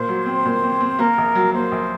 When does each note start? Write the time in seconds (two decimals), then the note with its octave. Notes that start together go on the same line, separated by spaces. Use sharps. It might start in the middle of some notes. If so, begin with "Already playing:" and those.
Already playing: A#2 C5
0.09 F#3
0.26 C4
0.45 A#2
0.63 C4
0.81 C4
0.99 A#3 A#4
1.18 A#1
1.35 F#3
1.53 A#3 C5
1.72 A#1